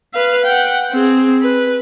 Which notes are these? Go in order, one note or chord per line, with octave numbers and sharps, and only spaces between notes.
B4 F5
F#5 G5
C4 G#4
B4